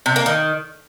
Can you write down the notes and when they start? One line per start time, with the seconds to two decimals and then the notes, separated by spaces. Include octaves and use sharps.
0.06 C3
0.16 A#3
0.26 D#3